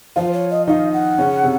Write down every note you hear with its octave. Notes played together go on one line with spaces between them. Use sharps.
F3 F4 C5
C#5
D#5
D#3 D#4 F5
F#5
C#3 C#4
C3